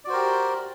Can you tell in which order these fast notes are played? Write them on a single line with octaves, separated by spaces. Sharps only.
D5 F#4 C5 A#4 G4